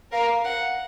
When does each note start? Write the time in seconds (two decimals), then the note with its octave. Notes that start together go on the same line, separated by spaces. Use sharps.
0.12 A#4 F5
0.45 F#5